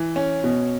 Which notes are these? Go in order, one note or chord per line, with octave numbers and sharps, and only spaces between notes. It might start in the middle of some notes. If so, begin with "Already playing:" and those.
Already playing: E3
C#4
B2